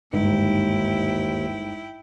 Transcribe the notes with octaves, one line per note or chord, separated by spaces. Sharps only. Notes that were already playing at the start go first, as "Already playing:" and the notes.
G1 D#2 G#2 D#4 E4 G5